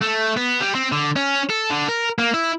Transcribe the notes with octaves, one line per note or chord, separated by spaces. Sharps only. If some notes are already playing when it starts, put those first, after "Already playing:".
A3
B3
G3
C4
D3
C#4
A4
D3
A#4
A#3
E4